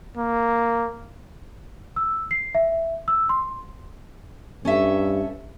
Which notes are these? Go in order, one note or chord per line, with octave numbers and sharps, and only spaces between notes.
A#3
E6
C7
E5
E6
C6
G2 C#4 A4 E5